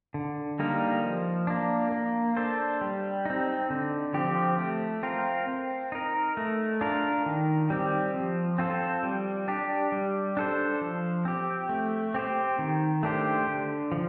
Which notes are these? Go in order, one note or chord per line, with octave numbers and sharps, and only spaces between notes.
D3
G3 A#3 D#4 A#4
F3
A#3 D4
A#3
D4 A4 C5
G3
C4 D#4
D3
F3 C4 G4
A3
C4 F4 A#4
C4
D#4 A#4
A3
D4 F4 A#4
D#3
G3 C4 G4
F3
C4 F4 A4 C5
G3
D4 G4
G3
D4 A4 C5
F3
C4 G4
A3
C4 G4 C5
D#3
A3 D4 G4 C5
D3
F3